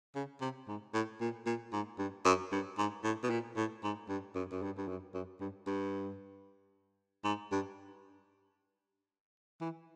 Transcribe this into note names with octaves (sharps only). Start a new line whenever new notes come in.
C#3
C3
G#2
A2
A#2
A#2
G#2
G2
F#2
G2
G#2
A2
B2
A#2
A2
G#2
G2
F#2
F#2
G2
G2
F#2
F#2
G2
G2
G#2
G2
E3